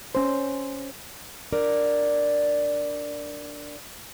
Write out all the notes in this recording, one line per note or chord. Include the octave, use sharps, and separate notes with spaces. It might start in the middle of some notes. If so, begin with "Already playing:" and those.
C#4 C5
D4 A#4 D5